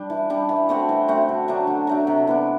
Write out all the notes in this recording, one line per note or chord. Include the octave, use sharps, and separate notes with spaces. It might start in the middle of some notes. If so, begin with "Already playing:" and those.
Already playing: G3 D4
E3
G3 D4
E3
A3 C4 F#4
E3
A3 C4 F#4
D3
F#3 A3 D4
D3
F#3 A3 D4
C3
E3 B3 D4